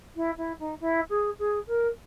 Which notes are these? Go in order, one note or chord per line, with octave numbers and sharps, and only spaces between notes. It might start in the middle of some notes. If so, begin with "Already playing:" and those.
E4
E4
D#4
E4
G#4
G#4
A#4